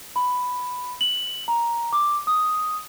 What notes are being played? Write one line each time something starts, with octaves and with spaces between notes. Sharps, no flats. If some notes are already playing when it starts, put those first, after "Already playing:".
B5
F#7
A#5
D6
D#6